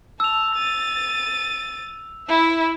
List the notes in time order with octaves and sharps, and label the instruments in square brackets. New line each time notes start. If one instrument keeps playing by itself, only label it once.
[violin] A5 [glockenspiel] E6 F7
[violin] A6 D#7
E4 E5